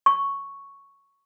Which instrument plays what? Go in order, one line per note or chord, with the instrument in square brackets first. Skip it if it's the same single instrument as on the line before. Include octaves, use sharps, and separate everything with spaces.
[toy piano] C#6